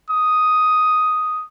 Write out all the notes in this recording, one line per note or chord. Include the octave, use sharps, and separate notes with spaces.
D#6